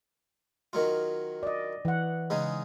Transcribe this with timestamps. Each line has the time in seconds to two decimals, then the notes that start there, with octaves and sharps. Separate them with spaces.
0.73 D#3 F#3 F4
1.43 D5 D#5
1.85 E3 F#5
2.30 C#3 G#3 D#4